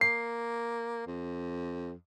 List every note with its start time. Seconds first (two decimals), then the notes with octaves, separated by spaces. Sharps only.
0.01 A#3 C7
1.07 F2